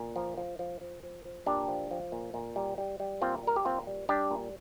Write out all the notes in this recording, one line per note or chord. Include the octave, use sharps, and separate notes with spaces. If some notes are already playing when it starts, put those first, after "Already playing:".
Already playing: A#2
F3
F3
F3
F3
F3
F3
A#2 D4 G4
F3
F3
A#2
A#2
G3
G3
G3
A#2 C4 F4
G3 A#4
G4
A#2 C4 F4
G3
G3 D4 G4
A#2